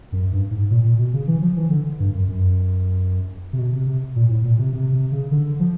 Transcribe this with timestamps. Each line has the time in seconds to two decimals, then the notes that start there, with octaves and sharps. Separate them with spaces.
0.12 F#2
0.32 G2
0.51 G#2
0.71 A#2
0.84 A#2
0.99 B2
1.14 C#3
1.27 E3
1.42 F3
1.57 E3
1.70 D3
2.00 G2
2.14 F#2
2.29 F#2
3.53 C3
3.58 B2
3.72 C3
3.87 C3
4.16 A#2
4.29 A2
4.44 A#2
4.58 C3
4.73 C3
4.92 C3
5.12 C#3
5.31 D3
5.60 F3